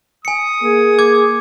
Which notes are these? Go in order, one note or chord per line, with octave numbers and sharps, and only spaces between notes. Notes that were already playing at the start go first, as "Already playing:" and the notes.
G#5 D#6 C#7
A#3 G#4
D6 G#6